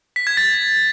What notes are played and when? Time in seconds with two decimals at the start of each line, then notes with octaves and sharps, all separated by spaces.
0.16 B6
0.27 G#6
0.37 A6